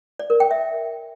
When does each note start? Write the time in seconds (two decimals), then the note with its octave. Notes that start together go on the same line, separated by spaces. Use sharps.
0.19 D5
0.30 A#4
0.40 G5
0.51 E5